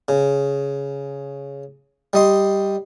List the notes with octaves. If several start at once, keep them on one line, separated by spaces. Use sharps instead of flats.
C#3
G3 D#5 C6